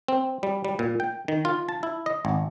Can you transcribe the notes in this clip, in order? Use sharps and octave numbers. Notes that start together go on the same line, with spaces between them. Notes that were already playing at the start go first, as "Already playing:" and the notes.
C4
G3
G3
A#2
G5
D#3
F4
A5
E4
D#5
G#1